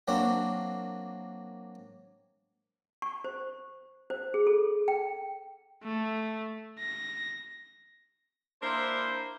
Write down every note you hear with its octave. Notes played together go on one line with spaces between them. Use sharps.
F#3 A#3 C4 D4
C#6
C5
C5
G#4
A4
G5
A3
A#6
A#3 D4 E4 C5